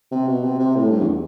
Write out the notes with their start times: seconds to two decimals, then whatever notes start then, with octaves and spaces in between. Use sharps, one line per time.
0.12 C3
0.28 B2
0.43 C3
0.59 C3
0.76 A2
0.91 G2
1.01 E2